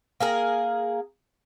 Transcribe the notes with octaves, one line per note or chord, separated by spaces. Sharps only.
A#3 G#4 A#4